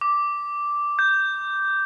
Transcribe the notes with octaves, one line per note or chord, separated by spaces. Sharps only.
D6
G6